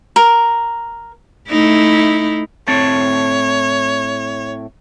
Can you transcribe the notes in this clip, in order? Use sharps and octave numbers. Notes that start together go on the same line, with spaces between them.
A#4
A3 D#4 E4
A2 C4 C#5 A5